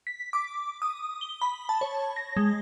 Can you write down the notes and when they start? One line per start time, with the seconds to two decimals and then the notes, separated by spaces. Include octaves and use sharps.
0.07 B6
0.33 D6
0.82 D#6
1.21 G7
1.42 B5
1.69 A5
1.81 C#5
2.16 A#6
2.37 G#3